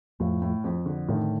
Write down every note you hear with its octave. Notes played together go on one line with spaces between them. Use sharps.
F2 A2
A2
F2
D3
A2 D#3